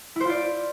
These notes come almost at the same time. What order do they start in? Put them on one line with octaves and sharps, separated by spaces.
E4 C5 F4 D5